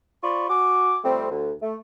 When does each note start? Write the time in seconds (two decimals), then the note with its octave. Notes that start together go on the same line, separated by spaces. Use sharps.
0.23 F4 C5 D5 B5 C#6
0.50 F#4 G#5 D6
1.04 F2 G3 A3 C4
1.31 D2
1.62 A3